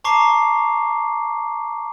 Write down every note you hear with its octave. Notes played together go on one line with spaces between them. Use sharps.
A5 A#5 C#6 D6 C7